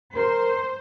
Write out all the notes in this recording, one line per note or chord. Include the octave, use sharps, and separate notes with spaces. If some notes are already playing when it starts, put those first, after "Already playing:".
A#4 C5